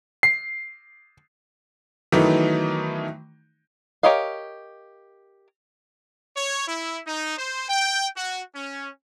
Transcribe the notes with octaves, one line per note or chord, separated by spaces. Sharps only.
C7
D#3 E3 F#3 A3 B3 D#4
G4 A#4 C#5 D#5 F5
C#5
E4
D#4
C5
G5
F#4
C#4